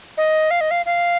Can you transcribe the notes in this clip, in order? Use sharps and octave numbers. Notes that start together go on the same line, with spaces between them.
D#5
F5
D#5
F5
F5